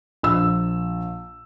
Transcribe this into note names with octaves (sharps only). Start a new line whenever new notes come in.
A#1 E6